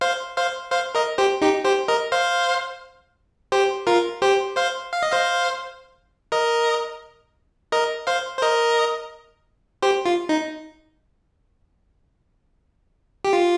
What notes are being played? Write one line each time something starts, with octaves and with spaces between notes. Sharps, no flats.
C5 F5
C5 F5
C5 F5
A#4 D#5
G4 C5
D#4 G4
G4 C5
A#4 D#5
C5 F5
G4 C5
F4 A#4
G4 C5
C5 F5
F5
D#5
C5 F5
A#4 D#5
A#4 D#5
C5 F5
C5
A#4 D#5
G4 C5
F4
D#4
G4
F4